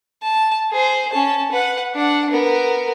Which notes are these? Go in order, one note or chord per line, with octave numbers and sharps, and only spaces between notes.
A5
G#4 C5
C#4 A5
B4 F#5
D4 F#5
B3 A#4